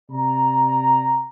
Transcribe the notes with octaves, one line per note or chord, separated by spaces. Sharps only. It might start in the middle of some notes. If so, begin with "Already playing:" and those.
C3 D5 A#5